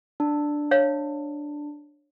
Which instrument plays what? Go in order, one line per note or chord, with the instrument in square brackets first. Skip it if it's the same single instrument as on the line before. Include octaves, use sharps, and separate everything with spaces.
[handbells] D4
[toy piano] C#5 F5